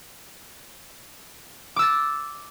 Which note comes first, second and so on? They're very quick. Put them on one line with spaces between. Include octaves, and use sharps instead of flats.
D6 E6 A6